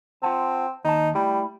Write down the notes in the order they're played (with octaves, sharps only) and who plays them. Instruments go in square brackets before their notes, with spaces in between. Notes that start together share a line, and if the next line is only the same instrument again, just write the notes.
[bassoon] C4 [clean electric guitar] F4 F#5 A5
[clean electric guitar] D#2 A5 [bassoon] D#4
[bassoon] G3 [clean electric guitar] A3 E4